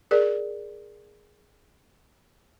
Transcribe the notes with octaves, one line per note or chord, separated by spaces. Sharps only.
G#4 A#4 D5